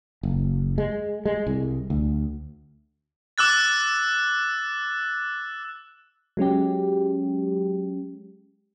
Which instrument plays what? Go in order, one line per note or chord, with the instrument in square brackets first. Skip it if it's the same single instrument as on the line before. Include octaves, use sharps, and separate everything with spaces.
[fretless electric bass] F#1
G#3
G#3
C2
D2
[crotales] D6 E6 F#6 A6
[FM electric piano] F#3 G#3 C#4 G4